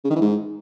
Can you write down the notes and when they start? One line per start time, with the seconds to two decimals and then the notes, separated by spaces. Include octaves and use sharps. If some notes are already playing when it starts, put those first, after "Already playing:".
0.04 C#3
0.10 D#3
0.16 E3
0.21 G#2